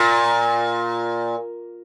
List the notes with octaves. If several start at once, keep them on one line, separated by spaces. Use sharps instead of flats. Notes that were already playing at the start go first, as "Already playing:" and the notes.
Already playing: A#2